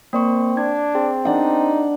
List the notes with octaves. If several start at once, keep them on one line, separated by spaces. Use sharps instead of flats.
A#3 C4 D5 C#6
D4 G#6
C4 G#4
D4 D#4 F#5